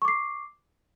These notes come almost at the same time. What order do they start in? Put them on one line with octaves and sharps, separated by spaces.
C#6 D6 C7